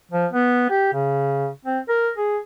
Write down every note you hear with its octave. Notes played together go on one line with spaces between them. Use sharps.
F3
B3
G4
C#3
C4
A#4
G#4